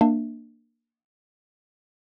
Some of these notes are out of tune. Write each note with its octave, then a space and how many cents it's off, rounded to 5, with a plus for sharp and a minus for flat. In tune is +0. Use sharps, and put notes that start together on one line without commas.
A#3 +0 D4 +25 E5 -10